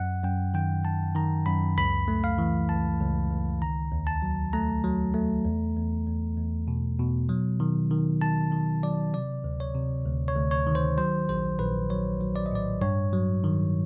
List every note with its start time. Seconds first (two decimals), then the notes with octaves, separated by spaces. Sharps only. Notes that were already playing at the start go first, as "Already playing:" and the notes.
Already playing: F#2 F#5
0.24 F#2 G5
0.54 D#3 G5
0.85 D#3 A5
1.15 D#3 A#5
1.46 F#2 B5
1.78 C#2 B5
2.08 A3
2.24 F5
2.38 E3
2.69 C#2 A5
3.00 C#2
3.31 C#2
3.62 D#3 A#5
3.92 D#2
4.07 A5
4.22 F#3
4.53 A3 A#5
4.84 F#3
5.14 A3
5.45 E2
5.77 E2
6.07 E2
6.38 E2
6.68 B2
6.99 B2
7.29 F#3
7.60 D#3
7.91 D#3
8.21 D#3 A5
8.52 D#3
8.83 F#3 D5
9.14 C3 D5
9.44 D2
9.60 C#5
9.75 C3
10.05 D2
10.28 C#5
10.36 D2
10.51 C#5
10.66 D#3
10.75 C5
10.98 F#3 C5
11.29 A#1 C5
11.59 A#1 B4
11.90 F#3 C#5
12.21 F#3
12.36 D5
12.46 D#5
12.51 A2 D5
12.81 G2 C#5
13.13 F#3
13.44 D#3